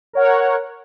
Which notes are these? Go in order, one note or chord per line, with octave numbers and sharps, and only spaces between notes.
A#4 C#5 F#5